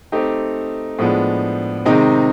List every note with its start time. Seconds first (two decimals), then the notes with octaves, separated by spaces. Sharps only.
0.12 A3 C4 D#4 G4
0.99 A2 F3 G#3 B3 D4
1.85 C3 D#3 G#3 C4 D#4